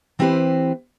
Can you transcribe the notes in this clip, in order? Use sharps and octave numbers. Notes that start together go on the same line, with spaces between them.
E3 C4 E4 G4 B4 C5